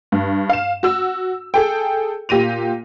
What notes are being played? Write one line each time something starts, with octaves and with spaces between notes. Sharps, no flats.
G2
F5 E7
F#4 E6
G#4 A4 G5
A#2 G4 A#6 D#7 F7